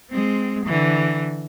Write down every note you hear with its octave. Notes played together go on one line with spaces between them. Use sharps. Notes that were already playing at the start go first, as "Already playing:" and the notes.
G#3 C4
D3 E3